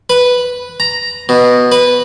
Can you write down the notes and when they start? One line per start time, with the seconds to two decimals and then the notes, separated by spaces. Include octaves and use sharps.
0.10 B4
0.80 A#5
1.29 B2
1.72 B4